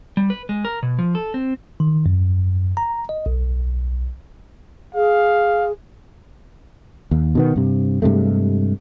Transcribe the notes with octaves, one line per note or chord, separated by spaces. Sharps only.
G3
B4
G#3
A#4
B2
F3
A4
C4
D#3
F#2
A#5
D#5
B1
G#4 F5
D#2
B2 D#3 B3
G2 C3
G2 C3 G#3 A3